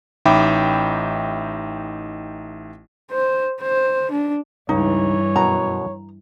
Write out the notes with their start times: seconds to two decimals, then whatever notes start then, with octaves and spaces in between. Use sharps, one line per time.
0.25 A1 D#4 E5 G5 B5 D6
3.11 C5
3.62 C5
4.12 D4
4.69 C#2 G2 E3 D#4 C#5
5.36 F#2 B2 A#5